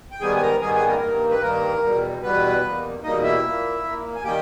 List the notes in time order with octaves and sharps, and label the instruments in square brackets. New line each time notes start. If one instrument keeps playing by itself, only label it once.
[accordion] G5
G#2 D#3 G3 B3 G#4 G#5
G#5
A#4 A#5
G#2 D#3 G3 B3 G#4 G#5
G#4 G#5
A#3 A#4
G2 D#3 A#3
B4
G2 D#3 A#3 A#4
E2 B2 G3
E2 B2 G3 B3 B4
E2 B2 G3 A#3
E2 B2 G3 A#3 D#4 D#5
E4 E5
A#2 A#3
A#2 A#3
G#5
D#3 G3 A#3 G4 G5